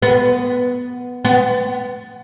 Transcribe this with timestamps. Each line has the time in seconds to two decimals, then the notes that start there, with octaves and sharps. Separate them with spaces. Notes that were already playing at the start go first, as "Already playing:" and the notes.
0.02 B3
1.25 B3